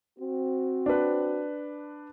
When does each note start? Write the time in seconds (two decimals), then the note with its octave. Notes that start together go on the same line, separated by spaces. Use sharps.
0.19 C4 F#4
0.86 D4 B4